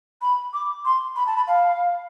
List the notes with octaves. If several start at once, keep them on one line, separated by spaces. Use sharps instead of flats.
B5
D6
C6
B5
A5
B5
F5